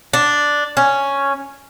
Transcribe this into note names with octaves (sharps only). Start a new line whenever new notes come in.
D4
C#4